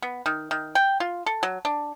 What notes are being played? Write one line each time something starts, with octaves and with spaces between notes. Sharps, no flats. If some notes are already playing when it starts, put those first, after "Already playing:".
B3
D#3
D#3
G5
F4
A4
F#3
D4